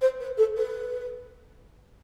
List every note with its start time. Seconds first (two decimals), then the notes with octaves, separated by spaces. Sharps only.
0.01 C5
0.20 B4
0.37 A4
0.57 B4